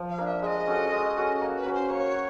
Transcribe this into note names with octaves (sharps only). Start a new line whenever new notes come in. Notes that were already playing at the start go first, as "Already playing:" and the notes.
Already playing: F3
F5
A#3 D4
E5
G#3 D#5 E5
C#4 F#4 A4
G#3
C#4 F#4 A4
A#3
B4
C#4 F#4
C5
A#3 C#5
F#4